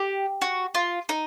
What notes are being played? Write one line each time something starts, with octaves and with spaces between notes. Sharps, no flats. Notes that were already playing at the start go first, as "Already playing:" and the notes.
Already playing: G4
F#4
F4
D#4